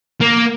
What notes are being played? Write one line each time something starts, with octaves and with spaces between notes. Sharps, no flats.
A#3